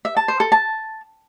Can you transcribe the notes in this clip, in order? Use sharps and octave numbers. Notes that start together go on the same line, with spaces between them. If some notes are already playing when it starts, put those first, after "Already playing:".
E5
A5
C5
A4
A5